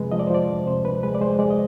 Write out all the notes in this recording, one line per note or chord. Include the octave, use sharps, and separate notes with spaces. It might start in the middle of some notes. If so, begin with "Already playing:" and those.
Already playing: C3 F3 G#3 B4
F3 D#5
D5
C5
F3 D5
D2
C3 C5
D2 B4
G#3 B4
D5
G#3 C5
G#3 D5
D#5